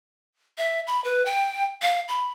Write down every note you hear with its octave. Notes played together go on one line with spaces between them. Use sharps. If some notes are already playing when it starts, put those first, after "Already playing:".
E5
B5
B4
G5
F5
B5